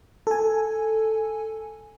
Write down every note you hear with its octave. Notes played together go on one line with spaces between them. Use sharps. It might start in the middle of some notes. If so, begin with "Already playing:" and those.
A4 G#5